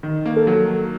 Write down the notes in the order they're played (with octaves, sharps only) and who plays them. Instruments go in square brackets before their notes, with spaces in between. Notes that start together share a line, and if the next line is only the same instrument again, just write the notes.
[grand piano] D#3
A#3
[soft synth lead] A4
[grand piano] F#3